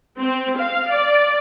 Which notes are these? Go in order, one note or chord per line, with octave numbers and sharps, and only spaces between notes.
C4
F5
D5